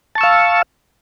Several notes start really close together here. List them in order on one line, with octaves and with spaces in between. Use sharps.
A5 C#6 E6 F5